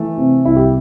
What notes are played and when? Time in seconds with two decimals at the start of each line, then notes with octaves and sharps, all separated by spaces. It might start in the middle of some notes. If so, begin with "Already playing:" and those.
Already playing: E3 A3
0.18 C3
0.45 C2 E4
0.56 G4